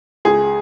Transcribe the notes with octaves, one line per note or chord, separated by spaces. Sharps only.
C#2 G#4